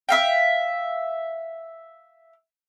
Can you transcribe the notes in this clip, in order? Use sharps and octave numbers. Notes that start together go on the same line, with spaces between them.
E5 F5 G5